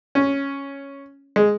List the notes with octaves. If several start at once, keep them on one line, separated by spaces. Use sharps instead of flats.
C#4
G#3